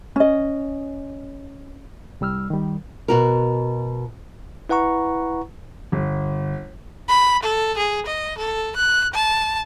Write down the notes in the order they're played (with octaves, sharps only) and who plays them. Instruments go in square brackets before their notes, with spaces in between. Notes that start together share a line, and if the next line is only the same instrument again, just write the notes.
[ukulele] C#4 D#5
[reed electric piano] C2 G3 E6 F6
D#3 G3
[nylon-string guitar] B2 F#4 A#4
[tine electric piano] E4 B4 F#5 A#5 C#6
[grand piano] G1
[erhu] B5
A4
G#4
D#5
A4
F#6
A5